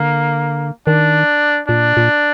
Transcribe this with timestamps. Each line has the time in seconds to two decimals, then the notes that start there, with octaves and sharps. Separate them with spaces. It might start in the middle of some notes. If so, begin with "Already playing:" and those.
Already playing: D3 A#3
0.87 D#3 D4
1.68 A#2 D4
1.97 A#2